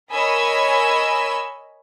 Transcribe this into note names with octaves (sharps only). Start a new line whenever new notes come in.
A#4 C#5 D#5 G#5 B5 E6